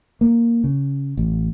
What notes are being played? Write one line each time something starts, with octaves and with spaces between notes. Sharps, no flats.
A#3
C#3
A1